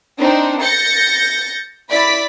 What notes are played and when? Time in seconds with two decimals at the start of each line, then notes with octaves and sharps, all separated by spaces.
0.19 C4 D4 D#4
0.60 G6 A6 A#6 C#7
1.91 E4 D5 B5 B6